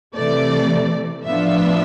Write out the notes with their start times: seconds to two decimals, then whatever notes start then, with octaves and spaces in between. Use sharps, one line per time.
0.15 C3 E3 A3 D5
1.24 A2 F3 B3 D4 F4 E5